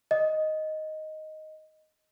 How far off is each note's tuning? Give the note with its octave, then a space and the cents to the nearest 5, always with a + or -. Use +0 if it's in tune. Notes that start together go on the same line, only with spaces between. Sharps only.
D#5 +5